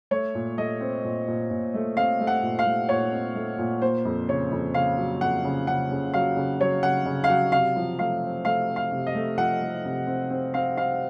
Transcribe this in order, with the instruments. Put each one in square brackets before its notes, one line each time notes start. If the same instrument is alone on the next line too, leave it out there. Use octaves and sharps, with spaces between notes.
[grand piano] A3 C#5
A#2
A3 D#5
C4
A#2
A#2
A#2
A3
C4 F5
A3
F#5
A#2
F5
A3
A#2 C#5
C4
A3
A#2
A#3 C5
F2
C#3 C#5
F2
C#3 F5
F#3
F2 F#5
C#3
C#3 F#5
C#3
F#3 F5
C#3
F#3 C#5
C#3 F#5
C#3
F5
F#3 F#5
C3 F5
F3
A3 F5
C4
A3 F5
C4
F5
C3
D#5
A3
F3 F#5
A3
C3
C4
C4
C4 F5
C4 F5